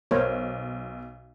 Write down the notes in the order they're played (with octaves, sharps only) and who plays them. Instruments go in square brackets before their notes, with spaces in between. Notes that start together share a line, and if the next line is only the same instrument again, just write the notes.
[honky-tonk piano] B1 [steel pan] A#4 C5 C#5